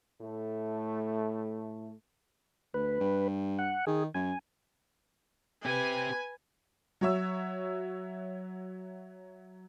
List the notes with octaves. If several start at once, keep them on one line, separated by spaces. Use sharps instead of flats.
A2 A3
D2 B4
G2
F#5
D#3 G#4
F#2 G#5
C4 G4 B4 G#5
F#3 F#4 C#5 E5 E6